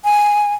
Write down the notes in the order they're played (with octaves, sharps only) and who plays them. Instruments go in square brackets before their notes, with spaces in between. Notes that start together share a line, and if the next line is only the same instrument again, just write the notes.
[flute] G#5